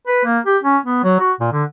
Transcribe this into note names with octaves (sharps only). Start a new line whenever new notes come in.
B4
A#3
G4
C#4
B3
F#3
F#4
A#2
D3